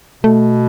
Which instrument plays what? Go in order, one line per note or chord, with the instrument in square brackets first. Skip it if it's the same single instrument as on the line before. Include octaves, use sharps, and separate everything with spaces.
[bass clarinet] B2 [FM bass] A3